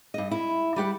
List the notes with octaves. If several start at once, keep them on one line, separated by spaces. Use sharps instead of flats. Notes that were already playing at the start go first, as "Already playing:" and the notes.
G2 D#5
E4
G3 G4 F#5